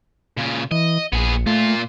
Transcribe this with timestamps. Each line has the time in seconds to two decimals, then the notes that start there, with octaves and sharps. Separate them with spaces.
0.37 A#2 C#3
0.71 E3 D#5
1.13 A#1 B3 G#4
1.46 A#2 A3 F4